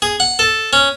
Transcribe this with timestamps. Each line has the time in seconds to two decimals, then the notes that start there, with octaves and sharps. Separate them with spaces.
0.02 G#4
0.20 F#5
0.39 A4
0.73 C#4